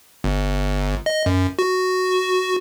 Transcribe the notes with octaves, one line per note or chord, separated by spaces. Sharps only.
G1
D#5
F#2
F#4